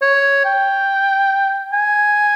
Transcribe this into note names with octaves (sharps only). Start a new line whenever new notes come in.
C#5
G5
G#5